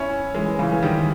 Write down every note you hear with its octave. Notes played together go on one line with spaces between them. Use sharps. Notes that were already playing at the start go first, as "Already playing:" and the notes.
Already playing: C#4 E4
E3 G#3
C#3 E3
G#3
D#3 G3